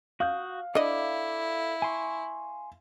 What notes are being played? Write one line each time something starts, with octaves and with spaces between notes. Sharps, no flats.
F#4 F5 D#6 G6
D4 E4 A4 D5 D#5 D6
G#5 C6 C#6